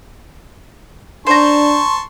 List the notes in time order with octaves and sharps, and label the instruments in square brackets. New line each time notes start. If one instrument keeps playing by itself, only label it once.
[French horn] D4 [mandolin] C5 A#5 [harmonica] A5 C6 C#6